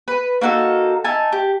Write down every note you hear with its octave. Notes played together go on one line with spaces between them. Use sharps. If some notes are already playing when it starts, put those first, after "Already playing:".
B4
A#3 D#4 F#4 A4
D#4 E5 G#5 A5
G4